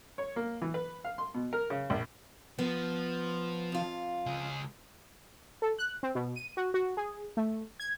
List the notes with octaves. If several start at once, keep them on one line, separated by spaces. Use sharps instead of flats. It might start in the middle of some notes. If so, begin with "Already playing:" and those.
C#5
A#3
E3
B4
F5
C6
B2
A#4
C#3
A#1
F3 B3
F2 F4
C#2 G#4
A4
F#6
C4
B2
D#7
F#4
F#4
G#4
A3
G#6